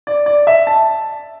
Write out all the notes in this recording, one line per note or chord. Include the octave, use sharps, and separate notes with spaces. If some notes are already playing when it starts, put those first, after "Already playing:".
D5
D5
E5
A5